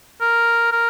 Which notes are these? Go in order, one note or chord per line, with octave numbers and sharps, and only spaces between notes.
A#4
A#4